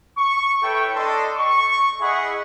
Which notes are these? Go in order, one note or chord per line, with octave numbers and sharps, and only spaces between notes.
C#6
E4 A4 B4 C#5 G5
D4 A4 D#5 C6
C#6
E4 G#4 D#5 E5 F#5 B5